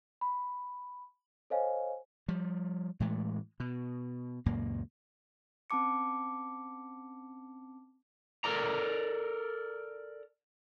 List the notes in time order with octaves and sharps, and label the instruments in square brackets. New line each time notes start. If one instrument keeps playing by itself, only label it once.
[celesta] B5
A4 C5 C#5 D#5 F5 G#5
[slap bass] F3 G3
A2 E3 G#3 A3
B2
C#2 F#2 A#2 A#3
[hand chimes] C4 C#4 A5 D6 C#7
[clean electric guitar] A4 A#4 D5 A#5